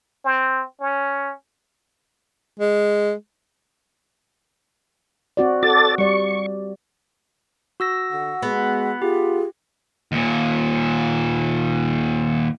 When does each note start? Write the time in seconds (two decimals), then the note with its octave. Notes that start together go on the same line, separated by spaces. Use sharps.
0.25 C4
0.80 C#4
2.60 G#3
5.37 C4 F#4 D5
5.63 F#4 A4 D5 A6
5.98 G3 D5 C#6
7.80 F#4 E6 A#6
8.11 D3 F#5
8.42 G#3 B3
9.02 F4 G4 G#4
10.12 D#2 A#2